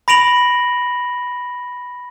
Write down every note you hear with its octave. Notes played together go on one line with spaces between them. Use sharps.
B5 A#6 D7 F7 F#7